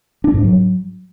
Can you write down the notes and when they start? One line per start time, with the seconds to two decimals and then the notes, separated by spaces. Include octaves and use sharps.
0.24 D4
0.34 G#2
0.44 F#3